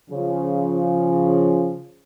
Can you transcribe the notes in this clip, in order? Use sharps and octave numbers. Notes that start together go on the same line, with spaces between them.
C#3 F3